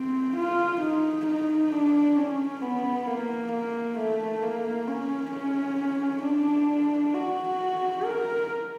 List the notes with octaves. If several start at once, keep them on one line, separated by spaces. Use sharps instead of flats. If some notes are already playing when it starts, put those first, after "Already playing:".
Already playing: C4
F4
D#4
D#4
D4
C#4
B3
A#3
A#3
A3
A#3
C#4
C#4
D4
F#4
A#4